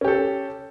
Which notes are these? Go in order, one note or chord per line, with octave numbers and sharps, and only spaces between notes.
C#4 G4 A4